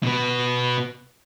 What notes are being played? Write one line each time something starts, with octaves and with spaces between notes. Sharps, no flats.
B2 B3